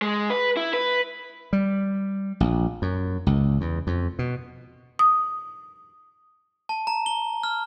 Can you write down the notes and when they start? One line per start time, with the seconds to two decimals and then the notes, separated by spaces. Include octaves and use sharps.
0.02 G#3
0.30 B4
0.57 E4
0.73 B4
1.53 G3
2.40 A#1
2.82 F#2
3.27 C#2
3.61 E2
3.87 F2
4.19 B2
4.99 D#6
6.69 A5
6.87 A#5
7.06 G7
7.43 F6